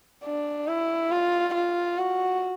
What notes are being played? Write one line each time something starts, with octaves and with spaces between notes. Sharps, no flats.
D4
E4
F4
F4
F#4